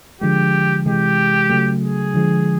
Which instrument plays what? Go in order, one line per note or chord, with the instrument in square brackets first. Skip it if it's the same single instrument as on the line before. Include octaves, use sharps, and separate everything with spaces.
[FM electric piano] D3 F3 G#3 [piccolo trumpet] G4
[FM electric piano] C3 E3 G#3 [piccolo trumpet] G4
[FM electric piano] C#3 F#3 A3
[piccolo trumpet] G#4
[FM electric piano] D3 F3 G#3